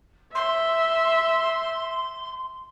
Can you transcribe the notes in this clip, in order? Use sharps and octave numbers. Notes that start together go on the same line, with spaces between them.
E5 C6